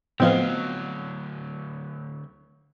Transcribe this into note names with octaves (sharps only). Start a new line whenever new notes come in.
D2 A2 F3 F#3 B3 C4 D#5 F5